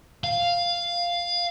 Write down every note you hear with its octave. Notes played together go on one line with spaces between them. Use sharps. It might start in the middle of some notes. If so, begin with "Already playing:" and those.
F5